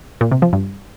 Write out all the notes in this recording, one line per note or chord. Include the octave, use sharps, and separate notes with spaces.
A#2
C3
F3
G2